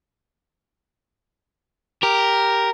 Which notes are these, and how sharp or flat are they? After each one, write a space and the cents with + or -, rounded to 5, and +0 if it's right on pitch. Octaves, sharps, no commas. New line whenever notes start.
G4 +0 A#4 +0